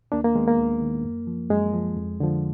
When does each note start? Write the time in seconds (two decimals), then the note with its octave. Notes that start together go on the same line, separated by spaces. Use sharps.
0.12 D#2 A#3 D4
0.24 A#3
0.35 D#3 G#3 B3
0.47 A#3
0.58 D#2
0.81 D#3
1.04 F#2
1.27 F3
1.50 F#2 G#3
1.73 F3
1.96 F2
2.20 D3 F3